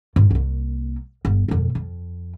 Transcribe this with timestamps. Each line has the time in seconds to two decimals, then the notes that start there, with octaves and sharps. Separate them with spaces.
0.16 G#2 F4
0.31 C2 A#3
1.25 G1
1.48 E1 F2
1.75 F2